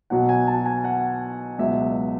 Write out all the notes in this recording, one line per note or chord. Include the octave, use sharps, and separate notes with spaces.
B1 B2 F#3 F#5
G#5
A5
G#5
F#5
C#2 B2 F#3 E5